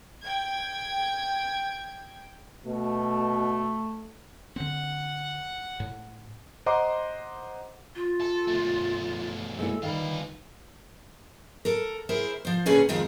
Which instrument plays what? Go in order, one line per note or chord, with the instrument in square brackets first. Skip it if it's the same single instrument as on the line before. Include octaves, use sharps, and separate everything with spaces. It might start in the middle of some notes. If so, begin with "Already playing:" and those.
[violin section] G5 G#6
[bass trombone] B2 [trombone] A3
[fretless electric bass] D3 C4 [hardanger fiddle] F#5
[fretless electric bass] A2
[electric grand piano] C5 D#5 F#5 A#5 C6 D6
[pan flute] F4
[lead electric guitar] A4
B2 A3
[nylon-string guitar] G#3 A#3 E4 [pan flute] A4
[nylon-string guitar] D#3 [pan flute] G3 [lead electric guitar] F4 B4
[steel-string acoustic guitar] A4 A#4
E4 G#4 A#4 C5
F3 C5
A#2 D3 C#4 G#4 B4
F2 D#3 G#3 F4